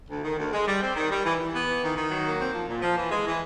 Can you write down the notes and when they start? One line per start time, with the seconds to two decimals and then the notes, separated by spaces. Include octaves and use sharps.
0.09 D2
0.24 D#3
0.38 D2
0.52 G#3
0.67 G3
0.82 C4
0.95 D#3
1.10 G3
1.24 E3
1.38 E3
1.54 B3
1.67 E3
1.83 D#3
1.97 D#3
2.11 F#3
2.26 A#3
2.39 C4
2.54 F3
2.68 A#2
2.82 F3
2.97 E3
3.11 G#3
3.25 E3